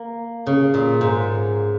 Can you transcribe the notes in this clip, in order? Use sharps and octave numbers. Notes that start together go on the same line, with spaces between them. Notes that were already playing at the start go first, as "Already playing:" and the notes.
Already playing: A#3
C#3
A#2
G#2